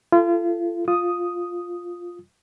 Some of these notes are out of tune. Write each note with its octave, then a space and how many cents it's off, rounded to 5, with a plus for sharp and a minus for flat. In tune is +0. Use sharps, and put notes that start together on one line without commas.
F4 -35 A4 +0
F4 +5 D#6 +0